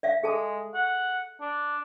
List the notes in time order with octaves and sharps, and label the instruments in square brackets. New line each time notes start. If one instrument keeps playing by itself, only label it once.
[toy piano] D5 E5 F5
[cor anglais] G#3 [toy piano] G#4 A4 A5
[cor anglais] F#5
D4